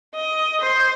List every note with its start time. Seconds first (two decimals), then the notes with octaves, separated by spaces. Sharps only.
0.14 D#5
0.61 C5